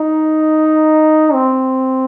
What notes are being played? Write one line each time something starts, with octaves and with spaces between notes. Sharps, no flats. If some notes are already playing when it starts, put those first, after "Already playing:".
Already playing: D#4
C4